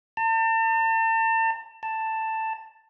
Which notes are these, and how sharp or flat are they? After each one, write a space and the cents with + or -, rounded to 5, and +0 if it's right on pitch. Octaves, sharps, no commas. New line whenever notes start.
A5 +40
A5 +10